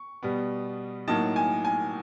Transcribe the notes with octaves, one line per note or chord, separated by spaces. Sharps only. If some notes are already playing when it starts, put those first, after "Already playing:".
Already playing: C#6
B2 G3 B3
A2 F#3 A#3 D#4 A5
G#5
G#5